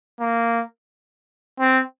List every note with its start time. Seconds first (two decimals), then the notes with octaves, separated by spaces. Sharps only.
0.20 A#3
1.60 C4